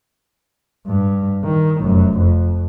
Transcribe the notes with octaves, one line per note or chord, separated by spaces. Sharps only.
G2
D#3
F1 F#2
F2